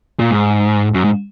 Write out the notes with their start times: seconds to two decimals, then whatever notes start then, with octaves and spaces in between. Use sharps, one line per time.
0.19 A#2
0.31 G#2
0.94 F#2
1.04 G#2